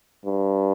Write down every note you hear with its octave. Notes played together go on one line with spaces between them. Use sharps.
G2